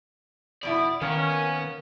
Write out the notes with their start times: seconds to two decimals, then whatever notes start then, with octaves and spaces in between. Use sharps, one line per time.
0.63 F2 B2 E4 D5
1.02 D#3 A#3 B3 C#4